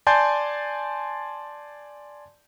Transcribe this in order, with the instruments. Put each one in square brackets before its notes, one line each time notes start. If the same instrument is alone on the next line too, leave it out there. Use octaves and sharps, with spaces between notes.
[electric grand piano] D5 G#5 A5 C6 G6